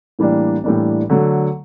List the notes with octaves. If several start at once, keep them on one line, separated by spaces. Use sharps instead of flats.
A2 E3 G3 A#3 D4
A2 E3 G3 A#3 D4
D3 F#3 A3